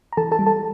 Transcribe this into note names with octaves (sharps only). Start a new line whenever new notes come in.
A#5
E3 A4 A5
A4 A5
G3
A4 A5